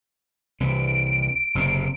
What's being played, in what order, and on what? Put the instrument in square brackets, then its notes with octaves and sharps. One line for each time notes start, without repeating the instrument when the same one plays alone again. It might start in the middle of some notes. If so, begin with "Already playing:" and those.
[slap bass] C2 E3 C4 [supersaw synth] D7
[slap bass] F#1 C3 C4